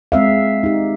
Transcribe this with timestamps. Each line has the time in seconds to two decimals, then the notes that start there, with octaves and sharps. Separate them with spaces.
0.12 G#3 C4 E5 F5
0.63 D#4 G4